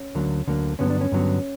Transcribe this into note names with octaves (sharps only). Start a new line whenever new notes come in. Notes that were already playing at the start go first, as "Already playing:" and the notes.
Already playing: C#4
D2 D3 F#3 A#3
D2 D3 F#3 A#3
G2 D3 F#3 B3 C#4
D4
C#4
G2 D3 F#3 B3